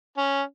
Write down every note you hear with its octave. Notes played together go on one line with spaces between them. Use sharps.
C#4